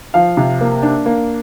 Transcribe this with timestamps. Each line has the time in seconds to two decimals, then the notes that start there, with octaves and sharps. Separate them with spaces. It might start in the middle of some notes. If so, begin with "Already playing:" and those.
0.14 F3 F5
0.37 C3
0.61 A#3
0.82 D4
1.06 A#3